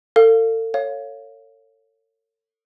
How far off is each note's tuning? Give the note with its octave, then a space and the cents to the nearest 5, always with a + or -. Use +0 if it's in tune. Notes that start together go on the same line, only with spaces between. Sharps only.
A4 +35 F5 +0
C#5 +0 F5 +0